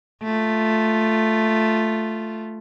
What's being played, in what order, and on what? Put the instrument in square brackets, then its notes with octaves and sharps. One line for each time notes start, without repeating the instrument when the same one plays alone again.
[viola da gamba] A3 F4